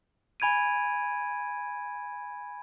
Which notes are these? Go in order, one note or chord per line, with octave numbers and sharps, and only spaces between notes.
G#5 B5 G#6 D7 D#7